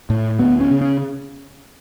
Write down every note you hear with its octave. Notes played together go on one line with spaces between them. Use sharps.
A2
D2 B3
C#4
C#3
C#4